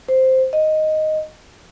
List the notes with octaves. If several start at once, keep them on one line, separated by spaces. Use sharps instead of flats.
C5
D#5